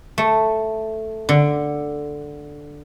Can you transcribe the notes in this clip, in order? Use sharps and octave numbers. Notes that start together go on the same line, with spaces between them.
A3
D3